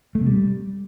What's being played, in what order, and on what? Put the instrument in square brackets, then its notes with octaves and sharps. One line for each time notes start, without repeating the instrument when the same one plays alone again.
[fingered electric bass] A3
C3
G3